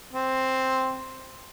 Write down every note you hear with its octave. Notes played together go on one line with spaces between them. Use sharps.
C4